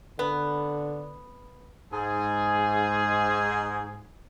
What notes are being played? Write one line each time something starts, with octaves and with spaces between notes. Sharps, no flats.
D3 B3
G#2 G#4